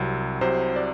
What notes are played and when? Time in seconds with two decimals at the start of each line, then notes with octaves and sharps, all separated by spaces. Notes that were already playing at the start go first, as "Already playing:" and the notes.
Already playing: C2 C3 F#3
0.41 C2 C3 F#3 C5
0.76 D5